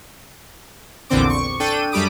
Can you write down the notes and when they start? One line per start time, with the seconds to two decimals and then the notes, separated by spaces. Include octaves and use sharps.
1.09 A#1 E2 A#2 D3 C4 D6
1.30 C#6
1.60 D4 A4 G5 D#7
1.92 F#2 G3 G4 B5 D6 D#6